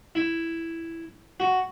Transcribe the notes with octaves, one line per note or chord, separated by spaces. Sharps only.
E4
F#4